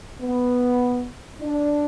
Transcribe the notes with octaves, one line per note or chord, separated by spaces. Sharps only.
B3
D4